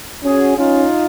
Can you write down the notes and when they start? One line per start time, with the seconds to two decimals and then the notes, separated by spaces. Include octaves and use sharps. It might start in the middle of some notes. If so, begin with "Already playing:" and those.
0.24 C#4 F#4 G#4
0.57 C#4 D#4 F4